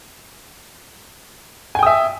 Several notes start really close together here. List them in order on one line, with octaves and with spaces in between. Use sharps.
G#5 G5 D#6 E5